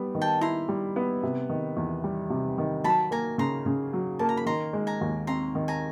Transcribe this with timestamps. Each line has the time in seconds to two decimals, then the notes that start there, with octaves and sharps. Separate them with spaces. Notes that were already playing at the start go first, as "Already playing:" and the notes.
Already playing: G3 B3
0.15 D#3
0.21 G5 A5
0.41 E4 A#5 C6
0.69 G3
0.96 B3
1.23 C3
1.50 D#3
1.77 E2
2.04 G3
2.30 C3
2.58 D#3
2.84 F#3 A5 B5
3.11 A#3 G#5 A#5
3.38 C#3 A#5 C6
3.66 C#3
3.93 F#3
4.19 A#3 A5
4.29 A#5
4.37 B5
4.46 D#3 A#5 C6
4.73 G#3
4.87 G#5 A#5
5.01 D#2
5.27 C4 A#5 C6
5.55 D#3
5.68 G#5 A#5